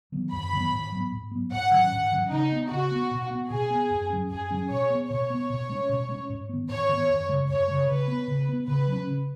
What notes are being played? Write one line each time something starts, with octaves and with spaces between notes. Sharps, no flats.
D#3 F#3 B3
F#2 B5
D#3 F#3 B3
G#2
F#3 B3
G#2
F#3 B3
G#2 F#5
D#3 F#3 C#4
G#2
D#3 F#3 C#4
C#3 D#4
B3
C#3 F#4
B3
B2
B3
B2 G#4
B3
F#2
F#3 C#4
F#2 G#4
F#3 C#4
B2 C#5
B3
B2 C#5
B3
B2
G#3 C#4
B2
G#3 C#4
G#2
D#3 B3
G#2 C#5
D#3 B3
F#2
C#3 G#3
F#2 C#5
C#3 G#3
C#3 B4
B3
C#3
B3
C#3 B4
F#3 C#4
C#3